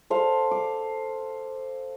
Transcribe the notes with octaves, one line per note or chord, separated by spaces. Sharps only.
A4 C5 F5
D6